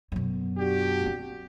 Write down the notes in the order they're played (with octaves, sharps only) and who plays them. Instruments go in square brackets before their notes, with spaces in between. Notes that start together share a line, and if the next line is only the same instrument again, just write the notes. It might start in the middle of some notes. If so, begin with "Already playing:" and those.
[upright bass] F#2 B2
[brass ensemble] D4 F#4 G4
[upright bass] C4